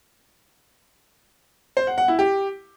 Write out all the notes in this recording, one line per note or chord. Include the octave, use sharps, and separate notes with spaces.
C5
F#5
F#5
E4
G4